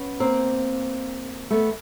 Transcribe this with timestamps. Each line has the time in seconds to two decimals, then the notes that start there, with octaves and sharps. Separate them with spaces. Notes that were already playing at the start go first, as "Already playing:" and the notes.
Already playing: B3 C#4
0.20 A#3 C4
1.50 A3 B3